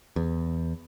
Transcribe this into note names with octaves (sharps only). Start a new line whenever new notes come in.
E2